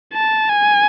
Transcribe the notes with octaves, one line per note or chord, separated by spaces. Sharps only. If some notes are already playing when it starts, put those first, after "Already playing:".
A5
G#5